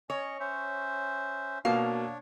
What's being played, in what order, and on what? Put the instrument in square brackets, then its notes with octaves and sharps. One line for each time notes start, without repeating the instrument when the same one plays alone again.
[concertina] C#4 D#5 [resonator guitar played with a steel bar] C#5
[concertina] C#4 C5 E5
[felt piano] B2 A#3 [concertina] D4 C#5 [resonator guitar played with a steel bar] F5